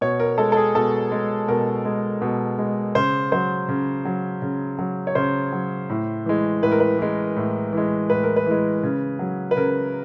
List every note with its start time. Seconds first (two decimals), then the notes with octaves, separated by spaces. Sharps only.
0.01 B2 C#5
0.20 A#4
0.38 G#3 A4
0.52 A4
0.57 G#4
0.75 B2 A4
1.12 G#3
1.48 B2 A#4
1.85 G#3
2.22 B2
2.59 G#3
2.95 C#3 C5
3.32 F#3 C5
3.69 C#3
4.05 F#3
4.42 C#3
4.79 F#3
5.07 C#5
5.15 C#3 C5
5.52 F#3
5.90 A2
6.26 E3 G#3
6.63 A2 B4
6.72 A#4
6.80 B4
6.99 E3 G#3
7.36 A2
7.73 E3 G#3
8.10 A2 B4
8.23 A#4
8.36 B4
8.46 E3 G#3
8.83 C#3
9.19 F#3
9.51 B4
9.57 C#3 A#4